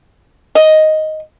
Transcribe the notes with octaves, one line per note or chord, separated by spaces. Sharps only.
D#5